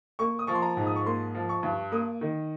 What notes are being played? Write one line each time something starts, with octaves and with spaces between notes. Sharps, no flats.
A#3 C#6
D#6
F3 C#6
C6
A#5
G#2
D#6
C#6
A#3 C6
F3
C#6
G2
A#3 D#6
D#3